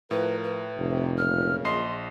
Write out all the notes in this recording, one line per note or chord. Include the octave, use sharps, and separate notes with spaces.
A2 F3 F4 A#4 B4
B4
F1 C3
F#2 A#2 C#3 F6
A#1 D#5 C6 C7